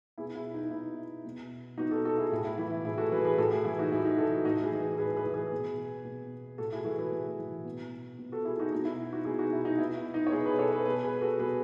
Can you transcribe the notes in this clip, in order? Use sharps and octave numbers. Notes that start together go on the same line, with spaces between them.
B2 E4 G#4
E4
D#4
B2 E4
B2
B2 D#4 F#4
F#4 A4
F#4 A4
E4 G#4
A2 E4
E4
E3 E4
A2 E4 G#4
F#4 A4
E3 G#4 B4
G#4 B4
A2 F#4 A4
E4 G#4
E3 E4 G#4
D#4 F#4
A2 E4
D#4
E3 F#4 A4
A2 D#4 F#4
E4 G#4
E3
A2 G#4 B4
G#4 B4
E3
G#4 B4
B2
B2
A2 F#4 A4
E4 G#4
E3 F#4 A4
G#4 B4
A2
E3
B2
B2
F#4 A4
E4 G#4
D#4 F#4
B2 D#4
E4
D#4 F#4
B2 E4 G#4
D#4 F#4
E4
D#4
B2 E4
E4
D#4
C#5
B2 G#4 B4
G#4 B4
A4 C#5
G#4 B4
B2 G#4 B4
G#4 B4
F#4 A4
B2 G#4 B4